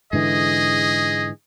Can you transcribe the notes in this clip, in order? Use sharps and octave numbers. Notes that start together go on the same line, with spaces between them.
G#2 D3 E3 G#4 D#5